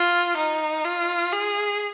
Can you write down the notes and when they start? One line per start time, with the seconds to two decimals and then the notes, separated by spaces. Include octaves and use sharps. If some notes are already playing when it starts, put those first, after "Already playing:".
Already playing: F4
0.37 D#4
0.85 F4
1.32 G#4